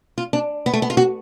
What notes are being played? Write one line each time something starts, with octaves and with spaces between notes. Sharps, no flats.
F4
D4
B3
A3
B3
F4
F#4